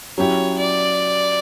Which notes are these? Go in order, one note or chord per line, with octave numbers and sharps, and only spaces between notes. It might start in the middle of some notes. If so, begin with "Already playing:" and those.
F#3 C#4 E4 G4 C#5
D5